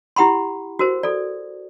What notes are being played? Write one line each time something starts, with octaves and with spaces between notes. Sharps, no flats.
E4 G4 F#5 B5 C6
F#4 A#4 C5
A4 D5